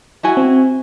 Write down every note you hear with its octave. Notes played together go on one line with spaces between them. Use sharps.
E4 F#4 G#5
C4